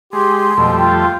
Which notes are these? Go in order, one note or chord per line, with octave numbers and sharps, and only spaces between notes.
G#3 G4 C6
F2 B2 G3 A3
F4 G5